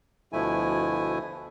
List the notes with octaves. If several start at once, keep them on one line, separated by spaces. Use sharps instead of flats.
D2 B2 F3 A3 E4 G#5